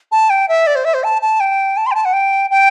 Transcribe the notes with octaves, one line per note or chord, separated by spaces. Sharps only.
A5
G5
E5
D5
C5
E5
C5
A5
A5
G5
A5
C6
G5
A5
F#5
G5
G5